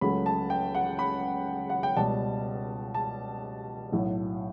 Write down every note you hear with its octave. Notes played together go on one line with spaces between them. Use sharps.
C#2 C#3 F#3 A3 B5
A5
G5
F#5
B5
F#5
G5
C#2 B2 G3 A5
A5
B1 A2 F#3